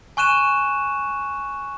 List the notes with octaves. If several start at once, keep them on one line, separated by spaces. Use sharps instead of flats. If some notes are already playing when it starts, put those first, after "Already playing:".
G#5 C#6 F#6 D#7 E7